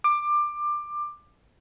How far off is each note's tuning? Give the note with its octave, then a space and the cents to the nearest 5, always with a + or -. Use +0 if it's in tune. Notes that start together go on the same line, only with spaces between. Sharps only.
D6 +20